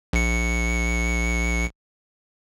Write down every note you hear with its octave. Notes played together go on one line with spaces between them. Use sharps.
A#1 C#7